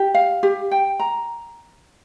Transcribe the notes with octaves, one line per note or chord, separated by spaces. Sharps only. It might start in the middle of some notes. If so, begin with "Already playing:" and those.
Already playing: G4
F5
G4
G5
A#5